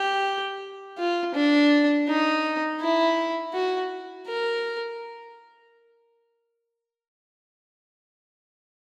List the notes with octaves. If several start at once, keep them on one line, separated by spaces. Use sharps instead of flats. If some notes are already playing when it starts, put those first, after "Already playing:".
Already playing: G4
F4
D4
D#4
E4
F#4
A#4